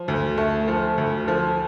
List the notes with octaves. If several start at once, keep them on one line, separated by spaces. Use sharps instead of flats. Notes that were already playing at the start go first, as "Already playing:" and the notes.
Already playing: F3
D2
A3
F3
D2
F3